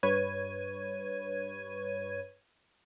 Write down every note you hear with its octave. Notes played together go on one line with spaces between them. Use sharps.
G2 B4 C#5 G#6 D#7